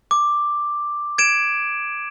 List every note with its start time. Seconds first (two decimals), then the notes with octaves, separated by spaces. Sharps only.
0.11 D6
1.18 G#6 D7 E7